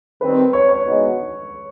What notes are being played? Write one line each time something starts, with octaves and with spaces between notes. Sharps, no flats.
D#3 G3 C4 B4
C#5
C#5
B2 G#3 B3 D#4 F#4